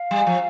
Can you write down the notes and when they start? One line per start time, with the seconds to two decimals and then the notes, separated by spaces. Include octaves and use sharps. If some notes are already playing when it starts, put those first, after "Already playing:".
Already playing: F5
0.11 G3
0.27 F3